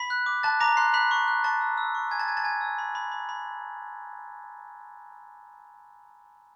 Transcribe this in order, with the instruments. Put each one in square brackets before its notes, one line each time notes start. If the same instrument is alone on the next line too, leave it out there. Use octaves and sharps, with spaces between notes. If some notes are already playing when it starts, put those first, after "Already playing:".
Already playing: [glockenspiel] B5 B6
F#6
D6
A5 F#6 A6
A#5 D6 A#6
C6 F#6 C7
B5 F#6 B6
C#6
F#6
A5 C#6 A6
E6
E6
C#6
G#5 G#6
A5 A6
G#5 G#6
A5 A6
G#5 G#6
E6
B5
B5
B5
B5